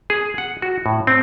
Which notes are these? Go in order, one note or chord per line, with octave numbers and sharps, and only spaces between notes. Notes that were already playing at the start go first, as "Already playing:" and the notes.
G#4
F#5
F#4
A2
C4